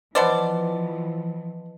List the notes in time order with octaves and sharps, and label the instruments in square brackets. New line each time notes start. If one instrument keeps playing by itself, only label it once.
[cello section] E3 F3 [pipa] B3 C5 D5 [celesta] B4 D#5 A5